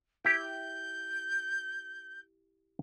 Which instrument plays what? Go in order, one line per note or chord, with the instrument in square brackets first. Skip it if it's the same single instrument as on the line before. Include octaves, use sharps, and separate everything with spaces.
[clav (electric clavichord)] E4 G4 G5 [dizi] G6